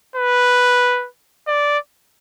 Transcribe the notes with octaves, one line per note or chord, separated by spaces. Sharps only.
B4
D5